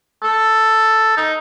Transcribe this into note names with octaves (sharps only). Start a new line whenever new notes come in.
A4
D#4